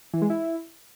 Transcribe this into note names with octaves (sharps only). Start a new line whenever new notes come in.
E3
G#3
E4